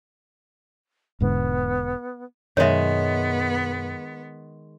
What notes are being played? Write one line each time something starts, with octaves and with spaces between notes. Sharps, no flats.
E1 G#2 D3 B3
F#2 B2 D#3 G#3 B3 C#5 E5